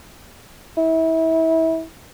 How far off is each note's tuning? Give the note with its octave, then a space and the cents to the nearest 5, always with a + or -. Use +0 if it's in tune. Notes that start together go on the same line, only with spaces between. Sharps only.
E4 -30